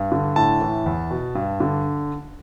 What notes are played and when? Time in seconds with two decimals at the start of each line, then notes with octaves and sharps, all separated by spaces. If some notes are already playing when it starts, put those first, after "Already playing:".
Already playing: G2
0.12 D3
0.36 A2 A5
0.61 E3
0.86 E2
1.11 B2
1.35 G2
1.60 D3